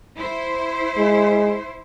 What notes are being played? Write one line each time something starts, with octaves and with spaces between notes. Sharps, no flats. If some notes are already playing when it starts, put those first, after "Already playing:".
E4 C5
G#3